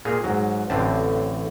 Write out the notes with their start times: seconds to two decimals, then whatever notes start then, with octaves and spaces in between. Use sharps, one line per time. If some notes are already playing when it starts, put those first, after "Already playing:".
0.05 A#2 G#4 F5 A#5
0.24 G#2 F#3
0.70 A1 A2 D3 C4 A5